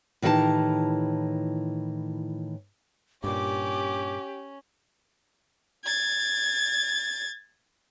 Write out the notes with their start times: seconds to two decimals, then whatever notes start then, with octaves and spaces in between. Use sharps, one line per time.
0.22 A2 D#3 E3 F#4 G4 A5
3.24 G2 A#2 C#4 G4 D6
5.85 G#6 A6